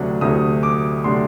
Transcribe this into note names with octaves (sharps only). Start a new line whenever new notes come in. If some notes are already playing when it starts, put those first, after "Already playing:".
Already playing: D2 C3 F#3 A3 D4
D2 C3 F#3 A3 D4 D#6
D6
C3 F#3 A3 D4 C6